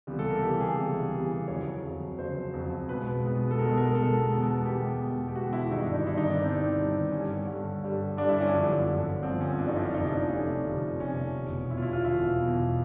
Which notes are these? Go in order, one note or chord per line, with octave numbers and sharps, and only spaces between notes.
C#2 C3 E3 G3 B3
A4
A#4
C#2 C3 E3 G3 B3 G4
G#4
C#2 C3 E3 G3 B3
C#2 C3 E3 G3 B3
F2 C#3 F#3 C#5
F2 C#3 F#3
F2 C#3 F#3 C5
F2 C#3 F#3
B1 B2 G#3 B3 B4
B1 B2 G#3 B3
A4
B1 B2 G#3 B3 A#4
A#4
B1 B2 G#3 B3 A4
E2 B2 G#3 B3
E2 B2 G#3 B3 G4
E2 B2 G#3 B3
G4
E2 B2 G#3 B3 F#4
E4
G1 G2 D#3 D#4
D4
D#4
G1 G2 D#3 E4
D#4
D4
G1 G2 D#3 C4
G1 G2 D#3
G2 D3 G3 C#4
G2 D3 G3
G2 D3 G3
G2 D3 G3 D4
E4
C#4
G1 F#2 D3 F3
G1 F#2 D3 F3
G1 F#2 D3 F3 C4
C#4
G1 F#2 D3 F3 D4
D#4
E4
F4
F1 F2 C3 F3 A3 D#4
D4
F1 F2 C3 F3 A3 C#4
F1 F2 C3 F3 A3
F1 F2 C3 F3 A3 C#4
E1 E2 B2
E1 E2 B2 E4
F4
E4
F4
E1 E2 B2 E4
E1 E2 B2